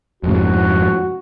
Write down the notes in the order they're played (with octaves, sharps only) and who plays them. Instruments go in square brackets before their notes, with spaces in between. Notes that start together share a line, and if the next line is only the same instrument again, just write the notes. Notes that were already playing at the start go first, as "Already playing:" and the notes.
[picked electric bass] F2 G#2 C#3 [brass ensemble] F#4